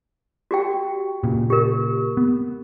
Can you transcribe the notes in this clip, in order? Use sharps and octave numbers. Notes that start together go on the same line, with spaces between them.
F#4 G4 G5
A#2 C#3
G4 A#4
B3